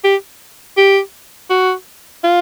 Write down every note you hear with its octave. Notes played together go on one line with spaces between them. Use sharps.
G4
G4
F#4
F4